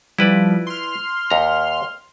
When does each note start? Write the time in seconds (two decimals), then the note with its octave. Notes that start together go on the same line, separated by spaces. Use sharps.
0.19 F3 G3 E4 B4 D5
0.67 C6 F6
1.30 D#2 A#5